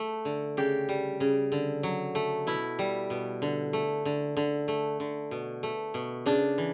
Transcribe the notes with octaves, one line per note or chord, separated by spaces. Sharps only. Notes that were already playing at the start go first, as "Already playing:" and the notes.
Already playing: A3
D3
C#3 G4
G3
C#3
D3
F#3
A3
B2 E4
G3
B2
D3
A3
D3
D3
A3
D3
B2
A3
B2
C#3 D4
E3